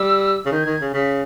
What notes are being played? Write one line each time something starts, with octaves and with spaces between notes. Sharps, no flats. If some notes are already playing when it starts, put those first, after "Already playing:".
Already playing: G3 E6
C#3
D#3 G6
G#6
D#3
G#6
C#3
C#3 B6